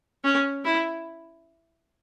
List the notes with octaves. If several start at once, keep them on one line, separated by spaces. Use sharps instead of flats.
C#4
E4